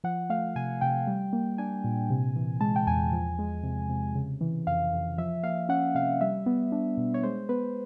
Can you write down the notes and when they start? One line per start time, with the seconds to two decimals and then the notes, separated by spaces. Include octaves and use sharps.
0.04 F3 F#5
0.30 A3 F5
0.56 C3 G#5
0.81 C3 G5
1.07 G3
1.33 A#3
1.58 D4 G#5
1.84 A#2
2.10 C3
2.36 E3
2.61 G#3 A5
2.76 G5
2.87 E2 G#5
3.12 F3
3.39 G#3
3.63 C3
3.89 C3
4.15 C#3
4.41 E3
4.67 F2 F5
4.93 F2
5.18 F3 E5
5.43 A#3 F5
5.69 C#4 F#5
5.95 C3 F5
6.21 G3 E5
6.46 B3
6.72 D4
6.97 B2
7.14 C#5
7.23 G#3 C5
7.49 B3 B4